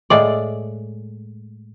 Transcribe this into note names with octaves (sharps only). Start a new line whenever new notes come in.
A2 G#3 D5